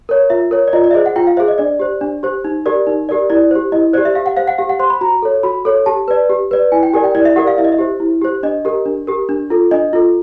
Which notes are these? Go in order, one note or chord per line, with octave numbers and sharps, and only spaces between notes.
A#4 C#5
F4 E5
A#4 C#5
D5
F4 D#5
D5
E5
G#4 C5 D#5
F#5
F4 G5
F5
G#4 C5 E5
D#5
D4 D5
G4 C5
D4
G4 C5
D#4
G4 A#4 D5
D#4
G4 A#4 D5
E4 D5
G4 C5
E4 D#5
G4 C5 D5
E5
G4 F5
F#5
C5 F5
F#5
G4 F5
F#5
C5 C6
B5
F#4 A#5
A4 C#5
F#4 B5
A4 C#5
G4 A5
B4 D5
G4
B4 D5
E4 G#5
G5
G4 A#4 D5 G#5
G5
E4 D5
E5
G4 A#4 D5 F#5
F5
E4 E5
D#5
E5
G4 C5
E4
G4 C5
D4 D#5
G4 A#4
D4
G4 A#4
D4
F4 A4
D4 D#5
F4 A4